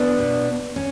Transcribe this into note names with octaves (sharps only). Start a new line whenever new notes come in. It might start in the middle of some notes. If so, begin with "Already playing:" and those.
Already playing: B3 D4
B2
C#4